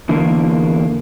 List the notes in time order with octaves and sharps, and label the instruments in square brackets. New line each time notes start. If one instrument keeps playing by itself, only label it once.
[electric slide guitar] E2 D3 A#3